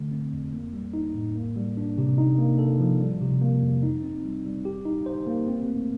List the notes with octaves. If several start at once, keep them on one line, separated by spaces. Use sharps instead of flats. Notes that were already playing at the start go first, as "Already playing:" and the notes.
Already playing: D3 A3
C4
F2
A#3
G3
D#4
A2
A#3
G3
D4
C3
D#4
A#3
A4
F3
G3
C3
A#3
F2
D#4
C4
G3
G3
G4
D#4
C5
A#3
C4
A3